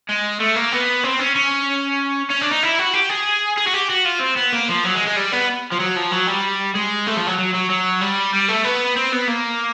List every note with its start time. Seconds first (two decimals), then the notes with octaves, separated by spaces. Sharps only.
0.09 G#3
0.40 A3
0.56 A#3
0.73 B3
1.04 C4
1.19 C#4
1.36 C#4
2.30 C#4
2.42 D4
2.51 D#4
2.63 E4
2.79 F#4
2.93 G4
3.09 G#4
3.57 G#4
3.67 F#4
3.73 G4
3.90 F#4
4.06 F4
4.20 C4
4.37 B3
4.53 A#3
4.69 F3
4.84 F#3
4.95 G#3
5.06 G#3
5.16 G3
5.32 B3
5.72 F3
5.80 F#3
5.96 F3
6.11 F#3
6.27 G3
6.75 G#3
7.07 A3
7.17 F3
7.27 F#3
7.38 F#3
7.54 F#3
7.70 F#3
8.01 G3
8.33 G3
8.49 A3
8.64 B3
8.97 C4
9.13 B3
9.28 A#3